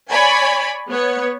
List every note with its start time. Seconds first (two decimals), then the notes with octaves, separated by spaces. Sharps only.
0.11 C#5 D5 G#5 B5
0.89 B3 C#5